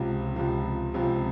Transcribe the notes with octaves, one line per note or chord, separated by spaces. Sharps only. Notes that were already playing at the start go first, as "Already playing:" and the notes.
Already playing: C#2 C3 F3
C#2 C3 F3
C#2 C3 F3